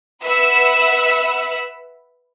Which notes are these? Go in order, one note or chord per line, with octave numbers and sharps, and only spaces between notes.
B4 E5 F#5 B5 E6